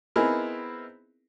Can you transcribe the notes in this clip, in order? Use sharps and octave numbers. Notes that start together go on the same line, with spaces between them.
B3 C4 D#4 E4 G#4 A#4